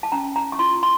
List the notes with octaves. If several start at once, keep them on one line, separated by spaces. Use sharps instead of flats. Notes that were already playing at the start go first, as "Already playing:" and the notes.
A5
C#4 A#5
A#5
C#6
F4 C6
C6